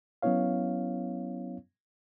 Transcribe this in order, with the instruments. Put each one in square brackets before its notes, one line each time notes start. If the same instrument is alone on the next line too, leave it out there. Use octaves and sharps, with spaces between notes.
[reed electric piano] F#3 B3 C#4 E4 C#5 F5